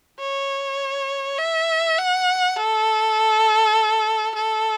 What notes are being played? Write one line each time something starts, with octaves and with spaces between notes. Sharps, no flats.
C#5
E5
F#5
A4
A4